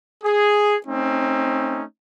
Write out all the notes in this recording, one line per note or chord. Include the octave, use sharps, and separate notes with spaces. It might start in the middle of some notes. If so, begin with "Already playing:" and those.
G#4
A3 C4 C#4 D#4